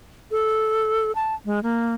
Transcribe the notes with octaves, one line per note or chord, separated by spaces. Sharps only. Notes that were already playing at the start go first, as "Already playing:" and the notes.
A4
A5
G#3
A#3